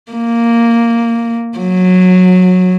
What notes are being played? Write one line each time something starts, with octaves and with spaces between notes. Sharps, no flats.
A#3
F#3